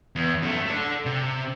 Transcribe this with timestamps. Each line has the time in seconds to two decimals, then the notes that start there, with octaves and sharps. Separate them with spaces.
0.16 E2
0.43 F#2 A3
0.66 A4 D5
1.06 C3